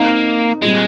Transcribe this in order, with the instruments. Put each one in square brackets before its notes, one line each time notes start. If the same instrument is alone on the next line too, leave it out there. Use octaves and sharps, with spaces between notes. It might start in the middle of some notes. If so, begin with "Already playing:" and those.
Already playing: [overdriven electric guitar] A#3 [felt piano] C4 D#4 A#4 D#5
[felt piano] A#2 G3 C4 [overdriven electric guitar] G#3